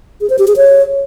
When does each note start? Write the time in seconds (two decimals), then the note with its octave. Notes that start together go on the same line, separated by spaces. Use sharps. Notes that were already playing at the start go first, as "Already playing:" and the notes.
0.21 G#4
0.30 C5
0.39 G4
0.47 G#4
0.56 C#5